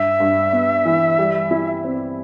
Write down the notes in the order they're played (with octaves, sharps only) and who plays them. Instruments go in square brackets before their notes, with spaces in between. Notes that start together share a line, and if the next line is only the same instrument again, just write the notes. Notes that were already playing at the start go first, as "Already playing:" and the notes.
Already playing: [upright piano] G2 [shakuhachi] E5
[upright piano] G2
B3
E3
G3
E4
C4